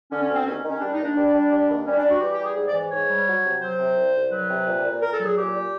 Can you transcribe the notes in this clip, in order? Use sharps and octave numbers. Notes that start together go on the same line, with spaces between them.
D3 C#4
C#4
D2
C4
D#2 C#4
D#3
C#4
G3 D4
D#4
D#2
D4
G3
G3
G3
D#2
G3 C#4
D4
G3
F#4
E3 G4
G4
G3
G#4
G#2 G#4
D5
E3
G#2 C#5
G3
F#3
C3
F#3 C5
C3
C2
C2
F#3 B4
C3
A#2
A#2
A#2 A#4
A4
F#3 G#4
A#2 G4
A#2